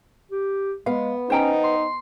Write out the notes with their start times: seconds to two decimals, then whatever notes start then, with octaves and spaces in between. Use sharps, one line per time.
0.31 G4
0.86 G#3 B3 F5
1.30 C#4 D#4 C5 G5 A#5
1.64 C6